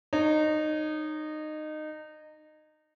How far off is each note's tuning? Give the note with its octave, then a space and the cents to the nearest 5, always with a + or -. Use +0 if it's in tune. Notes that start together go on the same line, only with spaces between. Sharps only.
D#4 -20 C#5 +0